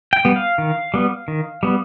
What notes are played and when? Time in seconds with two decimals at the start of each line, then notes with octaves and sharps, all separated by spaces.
0.13 G5
0.25 G3 B3
0.36 F5
0.58 D#3
0.94 G3 B3
1.28 D#3
1.63 G3 B3